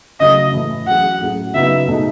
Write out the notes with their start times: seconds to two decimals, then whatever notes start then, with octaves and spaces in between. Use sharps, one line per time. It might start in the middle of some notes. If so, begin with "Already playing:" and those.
0.20 C#3 F#3 A3 D#5
0.54 A2 E3 A3 E4
0.87 F#3 C#4 G#4 F#5
1.21 A2 F#3 C#4 G#4
1.54 C#3 F#3 B3 D#4 F#4 E5
1.88 B2 A3 D#4 G#4